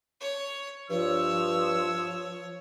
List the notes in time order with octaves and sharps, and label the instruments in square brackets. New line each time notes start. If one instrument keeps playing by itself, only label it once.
[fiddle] C#5
[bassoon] G2 [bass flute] F3 [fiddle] C#5 [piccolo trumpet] E6